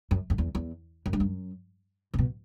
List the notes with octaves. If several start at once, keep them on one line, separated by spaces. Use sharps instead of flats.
F#2
F#2
E2
E2
F#2
G2
F#2
C3
B2